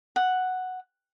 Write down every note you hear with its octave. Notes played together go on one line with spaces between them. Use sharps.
F#5